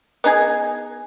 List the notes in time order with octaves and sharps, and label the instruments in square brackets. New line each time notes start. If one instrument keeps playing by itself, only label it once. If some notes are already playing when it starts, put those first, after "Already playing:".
[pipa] B3 D#4 G#4 G#5